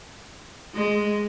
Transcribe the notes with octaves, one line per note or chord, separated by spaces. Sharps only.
G#3